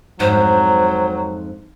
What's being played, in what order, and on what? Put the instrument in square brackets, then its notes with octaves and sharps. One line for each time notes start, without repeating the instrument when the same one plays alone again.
[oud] F2 G#2 [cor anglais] F#3 [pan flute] C5